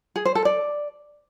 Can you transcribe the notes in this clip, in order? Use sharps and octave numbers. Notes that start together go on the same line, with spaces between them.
G#4
C5
A4
D5